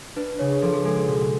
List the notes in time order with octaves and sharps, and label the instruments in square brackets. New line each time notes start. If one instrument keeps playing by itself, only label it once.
[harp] D4 [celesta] B4
[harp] C#3 [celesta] C#5
[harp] F3 [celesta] A4
[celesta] G#4
[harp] G#3 [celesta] A4
[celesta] A4
[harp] B2